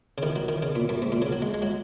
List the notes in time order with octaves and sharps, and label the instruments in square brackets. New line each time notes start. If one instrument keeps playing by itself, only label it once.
[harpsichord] C#3
D#3
F#3
D#3
C#3
A#2
F#2
G#2
A#2
C#3
F#3
G#3
G#3
F#3